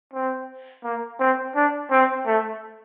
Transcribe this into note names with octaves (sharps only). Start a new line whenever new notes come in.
C4
A#3
C4
D4
C4
A3